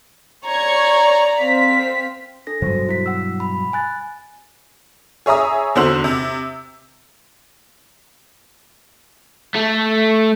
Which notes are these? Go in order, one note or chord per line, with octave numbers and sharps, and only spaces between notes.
C#5 D5 A#5 C#6 G#6
C4 F5 B6
D4 A4 A#6
G2 B2 F#3 F#4 C5
E4 B6
F#5 E6
B5
G#5 F#6 A6
G#4 C#5 E5 A#5 D#6
E2 D3 F#4 C5 E6 F#7
C3
A3